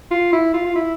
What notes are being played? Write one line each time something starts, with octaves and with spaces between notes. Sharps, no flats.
F4
E4
F4
F4
E4